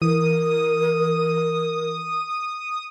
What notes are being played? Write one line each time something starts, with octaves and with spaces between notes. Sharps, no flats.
E3 A#4 D#6